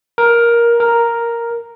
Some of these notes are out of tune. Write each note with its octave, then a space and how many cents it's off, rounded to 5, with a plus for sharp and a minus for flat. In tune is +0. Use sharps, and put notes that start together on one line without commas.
A#4 +10
A#4 +0